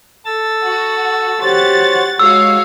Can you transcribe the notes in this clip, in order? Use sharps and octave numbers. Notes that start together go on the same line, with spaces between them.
A4 E6 A6
F#4
F#4 G4 C5 C#5 F#5 A6
G#3 F#4 C#5 F5 E6